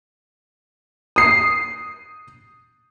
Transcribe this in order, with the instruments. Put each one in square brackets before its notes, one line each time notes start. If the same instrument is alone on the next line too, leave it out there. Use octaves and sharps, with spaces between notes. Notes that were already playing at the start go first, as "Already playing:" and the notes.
[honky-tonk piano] D#6 C7